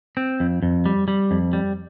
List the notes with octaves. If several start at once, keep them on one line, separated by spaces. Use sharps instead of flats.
C4
F2
F2
G3
G3
F2
G3